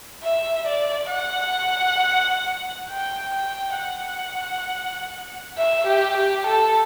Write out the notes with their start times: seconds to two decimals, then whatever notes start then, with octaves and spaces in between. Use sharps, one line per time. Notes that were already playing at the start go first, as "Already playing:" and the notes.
0.23 E5
0.67 D5
1.12 F#5
2.90 G5
3.35 G5
3.79 F#5
5.58 E5
5.87 G4
6.17 G4
6.46 A4